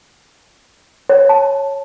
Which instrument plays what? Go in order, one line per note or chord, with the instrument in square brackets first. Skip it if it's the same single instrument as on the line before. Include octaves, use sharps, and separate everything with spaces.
[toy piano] C#5
A5